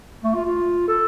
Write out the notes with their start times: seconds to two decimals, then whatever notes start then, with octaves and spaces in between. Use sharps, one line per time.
0.24 A3
0.34 F4
0.45 F4
0.88 A4